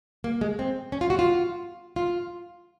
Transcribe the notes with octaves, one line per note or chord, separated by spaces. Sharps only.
A#3
G#3
C4
C#4
F4
F#4
F4
F4